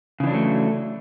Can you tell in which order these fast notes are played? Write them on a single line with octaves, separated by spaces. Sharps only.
C#3 E3 D4 F#3 A3